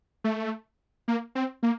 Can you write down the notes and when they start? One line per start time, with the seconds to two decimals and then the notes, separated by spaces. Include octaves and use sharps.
0.24 A3
1.08 A#3
1.35 C4
1.63 A#3